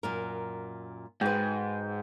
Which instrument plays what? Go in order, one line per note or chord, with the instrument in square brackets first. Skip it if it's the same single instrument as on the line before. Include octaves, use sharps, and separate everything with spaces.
[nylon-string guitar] F#2 A#2 A#4
[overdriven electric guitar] G#2 [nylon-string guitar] F#4 B4 [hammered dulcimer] G5